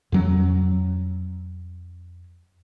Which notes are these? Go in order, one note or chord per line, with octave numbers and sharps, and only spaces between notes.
F2 F#3 C#4